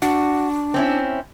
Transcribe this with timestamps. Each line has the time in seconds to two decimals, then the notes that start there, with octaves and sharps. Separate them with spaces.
0.02 D4 F#4
0.74 C4 C#4 E4